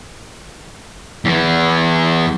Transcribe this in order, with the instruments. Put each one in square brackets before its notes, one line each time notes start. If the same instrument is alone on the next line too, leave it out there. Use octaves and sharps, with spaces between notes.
[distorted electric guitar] E2 E3